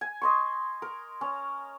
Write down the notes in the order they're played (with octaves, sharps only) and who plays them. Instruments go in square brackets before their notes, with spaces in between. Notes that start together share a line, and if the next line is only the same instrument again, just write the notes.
[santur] G#5
D#5 C6 C#6
A#4
C#4